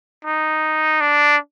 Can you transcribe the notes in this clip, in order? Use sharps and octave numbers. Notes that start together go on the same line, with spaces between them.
D#4
D4